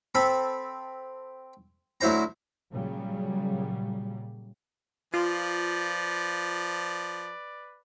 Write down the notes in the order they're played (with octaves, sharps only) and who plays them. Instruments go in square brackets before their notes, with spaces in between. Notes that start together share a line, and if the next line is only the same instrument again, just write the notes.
[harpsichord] C4 A4 B5
D2 F#3 E4 C5 A#5
[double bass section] A#2 C#3 F#3 G3
[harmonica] F3 [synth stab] F4 [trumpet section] B4 D5